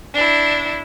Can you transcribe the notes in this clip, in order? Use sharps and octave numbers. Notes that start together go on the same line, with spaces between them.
D4 E4